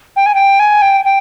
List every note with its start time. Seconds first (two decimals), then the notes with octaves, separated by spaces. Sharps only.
0.16 G5
0.26 G#5
0.35 G5
0.60 G#5
0.82 G5
1.05 G5